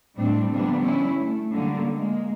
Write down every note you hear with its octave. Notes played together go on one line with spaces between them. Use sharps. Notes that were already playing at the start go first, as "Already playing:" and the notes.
A2 G3 C4 D4
D3 F3 G3 A#3 B3 D4
C#4 D4 E4
A3
D3 F#3 G3 A#3
G#3 A#3